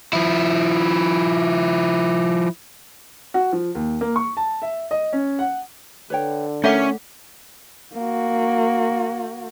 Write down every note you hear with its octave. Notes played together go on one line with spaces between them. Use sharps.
F3 E4
F#4
F3
D#2
A#3
C#6
A5
E5
D#5
C#4
F#5
D3 B4 C#5 G5
A3 C#4 E4 A4 A#4 E5 F#5
A#3 F#4